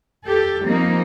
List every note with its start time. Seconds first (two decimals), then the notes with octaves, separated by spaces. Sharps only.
0.24 G4 A4
0.62 F3 G3 A#3 C4 D#4